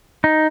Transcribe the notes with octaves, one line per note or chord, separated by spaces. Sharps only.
D#4